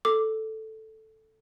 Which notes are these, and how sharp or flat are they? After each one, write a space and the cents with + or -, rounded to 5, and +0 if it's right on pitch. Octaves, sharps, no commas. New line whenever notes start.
A4 +0 D6 +0